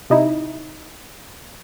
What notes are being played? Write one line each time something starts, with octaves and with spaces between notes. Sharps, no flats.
C3 D#4 E4